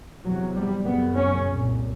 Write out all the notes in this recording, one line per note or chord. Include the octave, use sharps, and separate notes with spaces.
E2 C3 F#3
G3
F#2 C#3 B3
C#4
C2 A#2